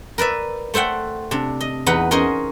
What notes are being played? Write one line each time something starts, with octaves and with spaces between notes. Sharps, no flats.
A#4 B4 D5 E5
A3 C5 E5 F#5 G5
C3 D4
D#5
E2 D#4 B4 F#5
C#4 G#4 A#4 C5 D#5